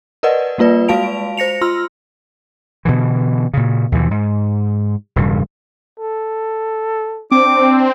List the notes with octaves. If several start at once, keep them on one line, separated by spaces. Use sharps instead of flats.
A#4 B4 D5 D#5 F#5
G3 A#3 F4 B4 D5
G#3 F#4 F5 A5 D7 F7
C5 A#6 C#7 F7
F4 C6 E6 F6
B2 D3 E3
A#2 C#3
D#2 B2 E3 F3
G#2
E1 G2 C#3
A4
C4 D4 D6